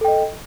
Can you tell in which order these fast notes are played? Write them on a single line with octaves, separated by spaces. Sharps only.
A4 G5 D#5